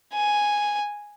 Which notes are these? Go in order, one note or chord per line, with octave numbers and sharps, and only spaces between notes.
G#5